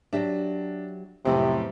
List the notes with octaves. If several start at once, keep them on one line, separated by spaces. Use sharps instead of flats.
F#3 D4 G4 E5
F2 A2 C3 F#3 B3 C5